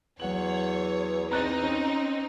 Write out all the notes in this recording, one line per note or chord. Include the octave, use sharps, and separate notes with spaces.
E2 F#3 C#5 F#5 F#7
C4 D#4 A#5 F#6 A6
C#4